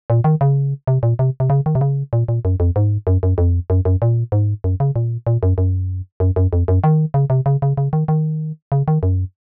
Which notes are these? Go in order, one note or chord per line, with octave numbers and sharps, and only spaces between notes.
A#2
D#3
C#3
C3
A#2
C3
C3
C#3
D#3
C3
C#3
A#2
A#2
F#2
F2
G#2
F#2
F#2
F2
F#2
F#2
A#2
G#2
F#2
C#3
A#2
A#2
F#2
F#2
F#2
F#2
F2
F#2
D#3
C#3
C3
C#3
C#3
C#3
D#3
D#3
C#3
D#3
F#2